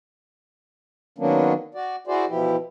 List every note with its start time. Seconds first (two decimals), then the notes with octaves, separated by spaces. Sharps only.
1.18 D#3 F#3 A#3 B3 C#4 D4
1.75 F#4 D5
2.07 E4 F#4 G#4 C5 D5
2.28 B2 E3 F3 E4 G4